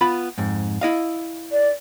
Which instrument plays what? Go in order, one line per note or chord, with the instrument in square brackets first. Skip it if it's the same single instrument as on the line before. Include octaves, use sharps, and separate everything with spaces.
[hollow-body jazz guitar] B3 F4 B5
F2 G#2
E4 D#5 F5
[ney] D5